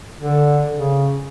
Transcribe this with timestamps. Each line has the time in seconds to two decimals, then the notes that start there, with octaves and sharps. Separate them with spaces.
0.21 D3
0.75 C#3